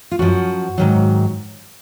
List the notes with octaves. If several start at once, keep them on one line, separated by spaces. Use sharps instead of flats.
F4
F#2 F3 F#4
G#2 D#3 F#3